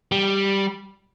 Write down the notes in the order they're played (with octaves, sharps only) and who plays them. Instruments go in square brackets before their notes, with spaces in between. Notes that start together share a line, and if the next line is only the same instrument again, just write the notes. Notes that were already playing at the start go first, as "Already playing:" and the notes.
[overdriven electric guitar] G3